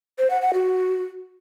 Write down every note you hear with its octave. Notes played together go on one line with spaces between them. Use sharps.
C5
F#5
F#5
F#4